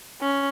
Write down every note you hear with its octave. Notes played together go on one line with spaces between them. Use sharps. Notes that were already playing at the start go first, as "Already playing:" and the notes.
C#4